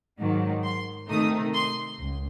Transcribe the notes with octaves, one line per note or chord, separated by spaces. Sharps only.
G#2 D#3 F#3
C6
C3 D#3 A3 D#4 D#6
C6
C#2